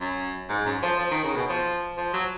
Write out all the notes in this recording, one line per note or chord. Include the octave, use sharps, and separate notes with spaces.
F#2
G#2
F#2
F3
F3
D#3
C#3
B2
F3
F3
F#3